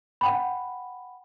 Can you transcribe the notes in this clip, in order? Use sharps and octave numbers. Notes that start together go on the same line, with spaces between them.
F#5 G5 B5